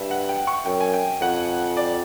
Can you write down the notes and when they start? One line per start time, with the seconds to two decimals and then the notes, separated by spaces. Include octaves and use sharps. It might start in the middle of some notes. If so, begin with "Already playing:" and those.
Already playing: G2 E5
0.11 F#5
0.29 G5
0.47 C#6
0.66 F#2 G5
0.81 G#5
0.94 G5
1.21 F2 F#5
1.77 D5